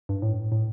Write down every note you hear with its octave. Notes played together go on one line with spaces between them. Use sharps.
G2
A2
A2